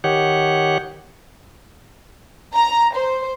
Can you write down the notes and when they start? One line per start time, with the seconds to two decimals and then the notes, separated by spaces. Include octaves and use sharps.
0.04 D#3 G4 C#5 F#5
2.54 A#5
2.94 C5